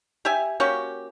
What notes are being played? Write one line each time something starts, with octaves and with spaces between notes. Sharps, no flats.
G4 E5 G#5
A#3 C#4 F#4 G4